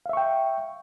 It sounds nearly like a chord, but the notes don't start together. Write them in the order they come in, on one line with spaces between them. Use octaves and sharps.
F5 E5 C#6 G5